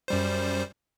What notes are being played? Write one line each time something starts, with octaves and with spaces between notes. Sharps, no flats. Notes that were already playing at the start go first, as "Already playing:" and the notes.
F#2 G3 C5